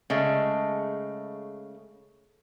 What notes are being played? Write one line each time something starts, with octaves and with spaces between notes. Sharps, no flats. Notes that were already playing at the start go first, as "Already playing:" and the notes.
C#3 G#3 A3